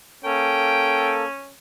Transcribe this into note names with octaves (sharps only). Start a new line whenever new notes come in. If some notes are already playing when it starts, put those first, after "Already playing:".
A#3 C#4 A4 G5